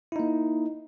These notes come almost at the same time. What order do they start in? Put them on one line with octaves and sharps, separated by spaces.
E4 D#4 A#3